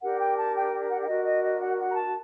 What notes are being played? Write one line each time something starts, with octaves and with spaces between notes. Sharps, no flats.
D4 G4 A#4 F#5
G5
A5
G5
F#5
F#5
D4 F#4 A#4 D#5
D#5
D#5
F#5
F#5
A#5
A5